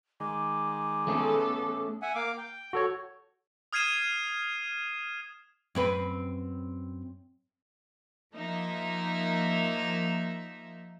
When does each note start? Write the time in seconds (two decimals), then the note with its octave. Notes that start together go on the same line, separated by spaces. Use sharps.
0.20 D#3 G#3 D6
1.08 A3 B3 C#4 G#4 A4
2.01 E5 F#5 G#5
2.15 A#3 F5 D6
2.37 G5
2.73 F#4 A4 C#5
3.73 D#6 F6 G#6 C7 D#7 E7
5.75 F#2 C4 B4
8.34 F3 A#3 D#4 E5